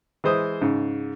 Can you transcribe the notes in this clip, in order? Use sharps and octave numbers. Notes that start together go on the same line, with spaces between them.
E3 G#3 C5 D#6
G#2 C#3